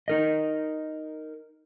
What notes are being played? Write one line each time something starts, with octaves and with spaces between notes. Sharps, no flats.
D#4 A#4 D#5